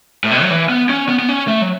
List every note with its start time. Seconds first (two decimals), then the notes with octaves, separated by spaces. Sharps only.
0.24 A2
0.31 B2
0.43 F#3
0.50 E3
0.69 B3
0.89 C#4
1.09 B3
1.19 B3
1.29 C#4
1.48 A3
1.62 F#3